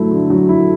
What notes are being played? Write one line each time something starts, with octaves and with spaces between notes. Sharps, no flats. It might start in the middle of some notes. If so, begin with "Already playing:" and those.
Already playing: D3 F#3 A3 E4
D3
F#3
E4